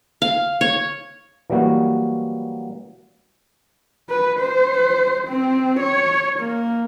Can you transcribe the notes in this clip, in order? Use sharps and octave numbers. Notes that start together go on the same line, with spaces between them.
F5
C#5
E3 F#3 G3 A#3 F#4
B4
C5
C4
C#5
A#3